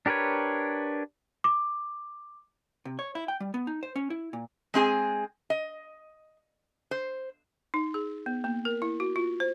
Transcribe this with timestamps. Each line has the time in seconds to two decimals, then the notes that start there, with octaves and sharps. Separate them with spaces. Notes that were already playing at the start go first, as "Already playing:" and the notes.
0.06 D4 G4 A#4 B4 C#5
1.44 D6
2.85 C3
2.99 C#5
3.15 E4
3.28 G5
3.40 G3
3.54 B3
3.67 D#4
3.83 C5
3.96 C#4
4.10 E4
4.33 A#2
4.74 G#3 C4 G#4 G#5
5.50 D#5
6.91 C5
7.74 D#4
7.94 G#4
8.26 B3
8.44 A#3
8.65 A#4
8.82 E4
9.00 F#4
9.16 F4
9.40 C5